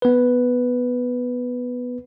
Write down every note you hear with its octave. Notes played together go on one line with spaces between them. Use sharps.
B3 B4